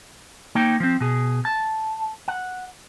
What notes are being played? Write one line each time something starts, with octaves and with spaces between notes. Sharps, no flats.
A#3 D#4 C#5 G5
F3 C4
B2 G#4
A5
F#5